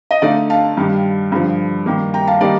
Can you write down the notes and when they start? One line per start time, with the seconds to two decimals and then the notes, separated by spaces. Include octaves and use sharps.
0.11 D#5
0.22 D3 A3 D#4 D5 F5
0.50 F5 A5
0.77 G2 D#3 G3
1.32 G2 D3 F3
1.86 G2 D#3 A#3
2.14 G5 A#5
2.27 F5 A5
2.41 D#3 G3 A#3 D#4 D5 F5